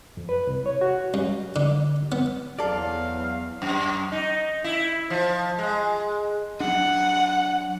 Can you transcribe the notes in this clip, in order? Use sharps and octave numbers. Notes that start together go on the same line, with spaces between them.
F2
B4
C2
C#5
F#4
F#2
D3
B3
E2 F#3 A4 D5 F5
F#2
D#4
E4
F3
G#3
F#3 D4 F#5